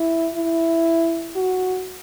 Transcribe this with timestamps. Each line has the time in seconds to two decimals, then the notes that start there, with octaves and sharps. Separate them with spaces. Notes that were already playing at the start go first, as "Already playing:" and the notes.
Already playing: E4
0.35 E4
1.36 F#4